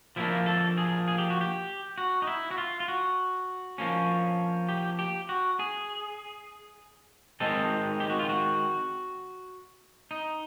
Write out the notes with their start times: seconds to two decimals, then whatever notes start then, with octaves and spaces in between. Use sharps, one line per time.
0.16 F3 A#3 D4 E4
0.46 A4
0.77 G#4
1.08 G#4
1.18 G4
1.30 F#4
1.41 G4
1.98 F#4
2.22 D#4
2.27 E4
2.51 F#4
2.58 F4
2.80 F4
2.88 F#4
3.78 F3 A#3 C#4
4.69 G4
4.99 G4
5.29 F#4
5.59 G#4
7.40 D#3 G#3 C4 D#4 A4
8.00 G4
8.10 F#4
8.19 F4
8.29 F#4
10.11 D#4